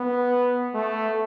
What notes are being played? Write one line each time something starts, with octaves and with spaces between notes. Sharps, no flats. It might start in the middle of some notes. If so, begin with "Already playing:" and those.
Already playing: B3
A3